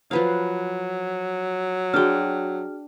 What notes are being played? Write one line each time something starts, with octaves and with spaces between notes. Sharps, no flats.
F3 F#3 B4 F5
D4 F#4 G#4 G5 F6